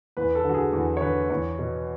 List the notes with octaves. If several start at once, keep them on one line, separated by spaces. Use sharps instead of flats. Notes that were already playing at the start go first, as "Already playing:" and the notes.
E2 B4
A4
D3 F#4
G#4
E2
C#5
D3 B4
E2 C#5
B2